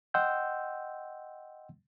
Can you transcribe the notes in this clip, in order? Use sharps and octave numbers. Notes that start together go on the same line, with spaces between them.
D#5 F#5 G5 C6 E6 G6